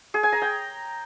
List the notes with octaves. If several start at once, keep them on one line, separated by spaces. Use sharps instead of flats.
G#4
G#5
A#5
G5